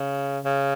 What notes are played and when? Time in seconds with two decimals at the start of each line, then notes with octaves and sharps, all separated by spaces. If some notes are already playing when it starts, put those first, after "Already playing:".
Already playing: C#3
0.45 C#3